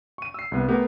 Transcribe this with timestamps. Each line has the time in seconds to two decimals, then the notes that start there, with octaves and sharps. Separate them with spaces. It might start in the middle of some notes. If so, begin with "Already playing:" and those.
0.18 C#6 D#7
0.34 E6 C7
0.52 C2 B3
0.68 A3 B3 G4 A#4